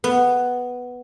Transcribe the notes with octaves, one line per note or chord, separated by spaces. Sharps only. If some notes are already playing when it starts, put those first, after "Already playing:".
B3